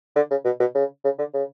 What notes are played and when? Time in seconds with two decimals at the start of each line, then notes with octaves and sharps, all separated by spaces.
0.16 D3
0.31 C#3
0.45 B2
0.60 B2
0.75 C#3
1.05 C#3
1.19 D3
1.34 C#3